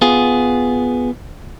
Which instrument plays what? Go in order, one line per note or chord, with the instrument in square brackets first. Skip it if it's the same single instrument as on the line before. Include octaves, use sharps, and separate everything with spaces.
[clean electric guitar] B3 F4 G#4